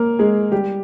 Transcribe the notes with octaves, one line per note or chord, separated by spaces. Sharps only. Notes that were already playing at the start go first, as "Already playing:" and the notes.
Already playing: A#3 A#4
G#3 G#4
G3 G4